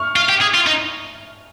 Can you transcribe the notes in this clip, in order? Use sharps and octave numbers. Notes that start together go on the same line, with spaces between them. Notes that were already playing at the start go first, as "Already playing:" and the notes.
Already playing: C#6 F6
F4
G4
G#4
F4
D#4